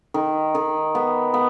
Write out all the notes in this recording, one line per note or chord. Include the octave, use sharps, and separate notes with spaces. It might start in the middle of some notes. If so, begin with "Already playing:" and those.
D#3
D#3
B3
B3